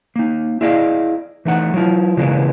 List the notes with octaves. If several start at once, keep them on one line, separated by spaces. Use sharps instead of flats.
A#3 D#4
E4 G#4 D5 D#5 F5
E3 A3 D#4 F#5
F#3 E4 F4
C#3 E3 G#3 A#3 B3